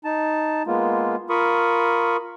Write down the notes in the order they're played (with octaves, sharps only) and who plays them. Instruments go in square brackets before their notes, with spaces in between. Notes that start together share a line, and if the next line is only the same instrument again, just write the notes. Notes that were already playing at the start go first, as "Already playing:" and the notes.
[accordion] D#4 A5
G#3 A#3 B3 F4
F4 A#4 B5 C#6 D#6